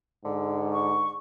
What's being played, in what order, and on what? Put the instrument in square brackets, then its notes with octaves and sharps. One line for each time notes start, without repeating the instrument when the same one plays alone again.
[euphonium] G#2 [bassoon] D3
[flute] C#6